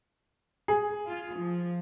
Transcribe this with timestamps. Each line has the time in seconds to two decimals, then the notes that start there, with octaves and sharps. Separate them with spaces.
0.68 G#4
1.08 F4
1.36 F3